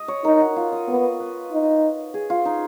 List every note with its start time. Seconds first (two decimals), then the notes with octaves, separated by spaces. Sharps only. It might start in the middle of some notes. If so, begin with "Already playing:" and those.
Already playing: D#5
0.08 C#5
0.24 D#4 A#4
0.41 F#4
0.56 F4
0.72 D#5
0.88 B3 D#5
1.20 B4
1.52 D#4
2.14 G#4
2.30 F4
2.45 D#4